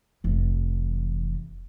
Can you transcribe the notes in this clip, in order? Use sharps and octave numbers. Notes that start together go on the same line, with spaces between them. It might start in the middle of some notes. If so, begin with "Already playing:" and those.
F1 E3